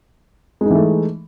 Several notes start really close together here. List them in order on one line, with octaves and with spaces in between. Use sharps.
G#3 D#4 E3 A3